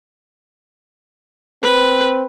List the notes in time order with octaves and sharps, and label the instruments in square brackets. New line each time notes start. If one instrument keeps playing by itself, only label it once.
[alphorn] C4 [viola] B4